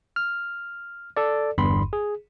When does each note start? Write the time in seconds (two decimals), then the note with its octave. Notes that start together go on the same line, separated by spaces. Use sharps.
0.16 F6
1.17 A4 D5
1.58 G1 E2 G2 B5 C6
1.93 G#4